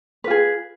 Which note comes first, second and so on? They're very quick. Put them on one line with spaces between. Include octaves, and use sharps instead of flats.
B4 F4 G#4